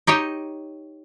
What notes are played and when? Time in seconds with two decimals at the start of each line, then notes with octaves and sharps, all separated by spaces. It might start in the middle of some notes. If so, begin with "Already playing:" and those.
0.07 D#4 G4 C#5 D#5